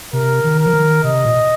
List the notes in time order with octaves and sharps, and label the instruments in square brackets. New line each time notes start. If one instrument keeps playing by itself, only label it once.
[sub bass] C3 [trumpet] A#4
[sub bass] D#3
[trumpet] A#4
[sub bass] F3
D#3
[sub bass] C3 [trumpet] D#5
[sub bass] A#2